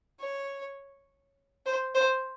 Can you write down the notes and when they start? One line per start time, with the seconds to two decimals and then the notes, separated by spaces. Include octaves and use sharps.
0.19 C#5
1.65 C5
1.95 C5